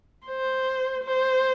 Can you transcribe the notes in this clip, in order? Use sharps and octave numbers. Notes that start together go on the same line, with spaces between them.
C5
C5